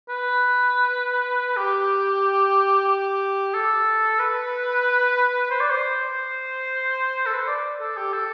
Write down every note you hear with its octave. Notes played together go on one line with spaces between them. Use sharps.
B4
G4
G4
A4
B4
C5
D5
C5
A4
B4
C5
D5
A4
G4
A4